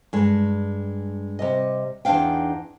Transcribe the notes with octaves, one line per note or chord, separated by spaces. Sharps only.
G2 G#3
C3 G3 D#5
E2 D4 D#4 F5 G5